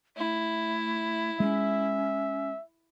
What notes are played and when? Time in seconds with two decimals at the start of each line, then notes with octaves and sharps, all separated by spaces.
0.17 A3 E4
1.40 G#3 C#4 E5